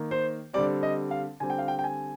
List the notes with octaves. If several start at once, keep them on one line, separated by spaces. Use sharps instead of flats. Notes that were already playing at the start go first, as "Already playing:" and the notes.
Already playing: D#3 A#3
C5
D3 G3 C4 D5
D#5
F5
D3 G3 C4 G#5
G5
F5
G5
G5
G#5